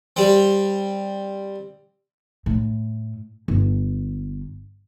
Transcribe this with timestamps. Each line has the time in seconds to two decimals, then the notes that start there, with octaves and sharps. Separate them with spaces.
0.16 G3 C4
2.46 A2
3.48 G1